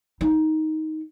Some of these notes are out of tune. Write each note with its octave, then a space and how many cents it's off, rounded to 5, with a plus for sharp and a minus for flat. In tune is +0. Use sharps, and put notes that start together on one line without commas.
D#4 +10